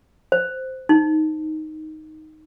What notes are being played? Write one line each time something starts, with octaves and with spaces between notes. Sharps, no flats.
C5
D#4